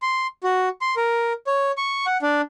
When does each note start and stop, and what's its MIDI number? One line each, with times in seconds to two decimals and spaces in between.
0.02 0.27 84
0.44 0.69 66
0.81 0.95 84
0.97 1.33 70
1.47 1.72 73
1.77 2.06 85
2.06 2.17 78
2.22 2.41 62